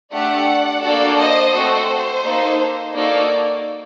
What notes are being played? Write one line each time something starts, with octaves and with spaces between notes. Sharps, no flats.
A3 D4 G4 D5 F#5
A#3 D4 F#4 A4 D5
C5 D#5
A3 C4 F#4 A4 C5
A#3 D#4 A4
A#3 D#4 F#4 A4 D5